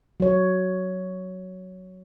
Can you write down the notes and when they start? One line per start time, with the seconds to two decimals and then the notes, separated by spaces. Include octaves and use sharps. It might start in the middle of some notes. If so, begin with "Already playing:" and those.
0.20 F#3 C#5